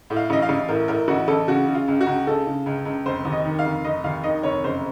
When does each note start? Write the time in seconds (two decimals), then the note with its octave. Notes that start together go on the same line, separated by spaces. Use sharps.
0.10 A2
0.16 F5
0.30 A1 D#5
0.42 F5
0.49 A1
0.68 A2 A#4
0.88 A2 A#4
1.08 A1 F#4
1.28 A1 A4
1.48 C#3 F#4
1.68 C#3
1.74 F4
1.88 C#2
2.01 F#4
2.06 C#2
2.27 C#3 A4
2.46 C#3
2.66 C#2
2.85 C#2
3.06 F1 C5
3.25 D#2
3.32 D#5
3.45 D#3
3.59 F5
3.65 F1
3.84 F1 D#5
4.04 D#2 F5
4.23 D#3 D#5
4.43 F1 C#5
4.64 F#1 C5